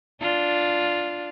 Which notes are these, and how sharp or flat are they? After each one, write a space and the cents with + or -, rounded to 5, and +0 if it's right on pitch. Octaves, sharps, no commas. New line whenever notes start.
D4 +0 F4 +0